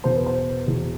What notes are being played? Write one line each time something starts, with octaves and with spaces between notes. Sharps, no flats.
E2 B2 C5
B4
C5
E2 B2